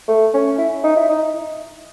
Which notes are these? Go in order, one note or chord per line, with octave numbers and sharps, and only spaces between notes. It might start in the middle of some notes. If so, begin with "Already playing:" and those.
A3
C#4
E4
D#4
E4
D#4